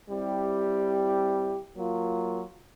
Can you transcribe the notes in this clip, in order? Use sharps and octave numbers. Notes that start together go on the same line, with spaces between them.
G3 C4 E4 G4
F#3 A#3 F4